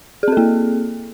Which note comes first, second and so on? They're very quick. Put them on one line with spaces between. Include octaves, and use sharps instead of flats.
G#4 C4 A4 A#3